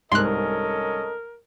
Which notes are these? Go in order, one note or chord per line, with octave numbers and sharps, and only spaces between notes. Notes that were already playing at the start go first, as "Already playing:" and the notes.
C2 G#2 C#4 A4 A#4 D#5 C6 F#6